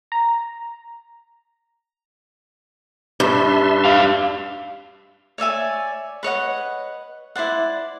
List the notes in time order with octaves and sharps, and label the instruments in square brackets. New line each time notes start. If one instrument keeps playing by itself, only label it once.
[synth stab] A#5
[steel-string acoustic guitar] G2 [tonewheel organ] D4 E5 C6
[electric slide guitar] G4 F5
[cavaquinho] C#5 D5 E5 G#5
B4 C#5 D#5 F#5
E4 C5 D5 F#5